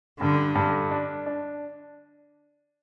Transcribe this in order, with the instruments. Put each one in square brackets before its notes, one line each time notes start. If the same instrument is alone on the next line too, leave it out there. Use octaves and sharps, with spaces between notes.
[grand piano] G2 [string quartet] D3
[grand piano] G2
D4
D4